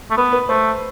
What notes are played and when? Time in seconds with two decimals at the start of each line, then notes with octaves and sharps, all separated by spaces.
0.11 A3
0.17 B3 B4
0.33 B4
0.49 A3 C5